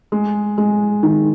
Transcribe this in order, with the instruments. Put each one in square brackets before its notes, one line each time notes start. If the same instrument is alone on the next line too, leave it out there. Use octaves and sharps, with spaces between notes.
[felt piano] G#3
G#3
D#3